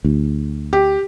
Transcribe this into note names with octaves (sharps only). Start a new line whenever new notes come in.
D2
G4